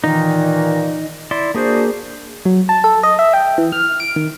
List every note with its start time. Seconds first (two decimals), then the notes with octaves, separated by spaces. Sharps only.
0.04 A#2 D#3 E3 D#4
1.31 E4 D5 C6
1.55 A#3 D4 F#4 G#4 C5
2.46 F#3
2.69 A5
2.84 A4
3.03 D#5
3.19 E5
3.34 G5
3.58 E3
3.72 F6
4.00 D7
4.16 D#3